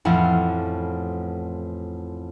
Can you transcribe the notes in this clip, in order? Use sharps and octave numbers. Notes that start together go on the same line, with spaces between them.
A1 F2 F3 E4 F5 F#5